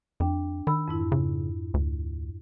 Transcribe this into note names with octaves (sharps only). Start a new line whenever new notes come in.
F2 D4 G5
D#3 B5 E6
F2 G#2 E4
C#3
D2